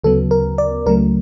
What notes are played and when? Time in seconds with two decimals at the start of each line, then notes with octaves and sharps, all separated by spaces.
0.04 D2 C#3 F#3 B3 A4
0.31 A#4
0.58 D5
0.86 C#2 C#3 F#3 A3 A#4